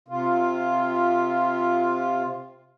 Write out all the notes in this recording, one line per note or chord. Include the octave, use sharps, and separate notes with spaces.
C3 F4